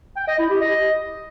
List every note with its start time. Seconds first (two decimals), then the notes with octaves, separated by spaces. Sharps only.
0.17 G5
0.28 D#5
0.39 E4
0.50 G4
0.61 D#5